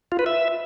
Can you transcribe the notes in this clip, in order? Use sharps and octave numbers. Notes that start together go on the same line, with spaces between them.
F4
B4
E5